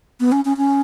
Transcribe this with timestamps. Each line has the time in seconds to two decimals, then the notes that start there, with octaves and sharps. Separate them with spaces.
0.20 B3
0.32 C#4
0.45 C#4
0.57 C#4